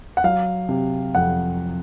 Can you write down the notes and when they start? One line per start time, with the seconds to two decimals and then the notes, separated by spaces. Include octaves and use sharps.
0.17 F#5
0.24 F#3 F5
0.69 C3
1.15 F2 F#5